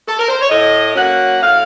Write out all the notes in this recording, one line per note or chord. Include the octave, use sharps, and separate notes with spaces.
A4
A#4
C5
C#5
A2 D#5
F#3 A#3 C#4 F#5
A2 F5